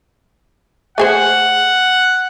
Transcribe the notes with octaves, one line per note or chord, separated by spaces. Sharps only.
A3 G#4 C5 F#5